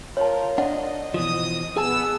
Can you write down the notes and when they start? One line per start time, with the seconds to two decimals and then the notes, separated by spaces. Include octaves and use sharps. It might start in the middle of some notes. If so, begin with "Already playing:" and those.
0.17 F4 A#4 C#5 A5
0.58 D4 D#5 F#5
1.14 B2 E3 F3 D#6
1.77 B3 G#4 G#5 A5 E6